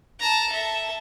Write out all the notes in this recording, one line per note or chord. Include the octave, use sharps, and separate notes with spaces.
A5 A#5
A4 E5